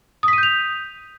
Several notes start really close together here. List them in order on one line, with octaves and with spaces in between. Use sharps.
D#6 B6 D#7 G6 F7